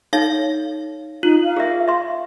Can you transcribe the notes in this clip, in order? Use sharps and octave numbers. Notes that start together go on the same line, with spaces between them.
D#4 A4 C#5 F5 A#6
D#4 F4
F5
G#4 A#4 E5
E5 C6